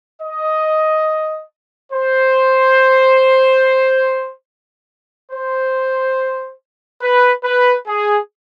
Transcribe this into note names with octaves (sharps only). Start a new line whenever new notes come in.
D#5
C5
C5
B4
B4
G#4